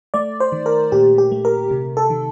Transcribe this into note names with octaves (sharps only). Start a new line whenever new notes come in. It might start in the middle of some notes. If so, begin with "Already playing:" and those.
A3 D5
C5
D#3
A#4
A#2 G4
G4
A3
A#4
C3
A4
D#3